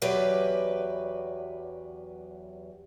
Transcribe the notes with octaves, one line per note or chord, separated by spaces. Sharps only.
E2 F#3 G4 B4 D5 E5